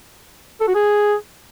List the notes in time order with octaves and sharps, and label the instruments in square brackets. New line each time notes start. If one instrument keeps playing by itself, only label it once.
[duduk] A4
F#4
G#4